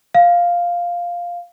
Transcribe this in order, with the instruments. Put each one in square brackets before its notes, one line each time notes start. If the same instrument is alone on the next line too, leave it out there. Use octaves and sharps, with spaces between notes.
[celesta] F5